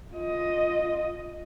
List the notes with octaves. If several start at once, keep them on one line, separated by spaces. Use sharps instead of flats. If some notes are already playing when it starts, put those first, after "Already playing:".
F4 D#5